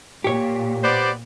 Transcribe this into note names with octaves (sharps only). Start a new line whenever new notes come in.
A#2 G4 C#5
B3 C5 D5